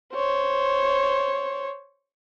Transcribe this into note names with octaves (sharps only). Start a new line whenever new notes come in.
C5 C#5